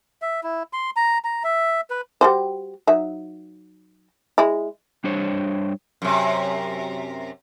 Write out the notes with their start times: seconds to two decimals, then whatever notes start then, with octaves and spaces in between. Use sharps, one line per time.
0.22 E5
0.43 E4
0.73 C6
0.96 A#5
1.24 A#5
1.44 E5
1.90 B4
2.21 G3 F#4 C5
2.87 F#3 D#4 E5
4.38 G#3 E4
5.04 G3 D4 C5 C#5
6.02 F#2 C3